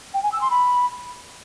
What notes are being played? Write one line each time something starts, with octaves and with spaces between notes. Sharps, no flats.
G5
G#5
E6
C6
B5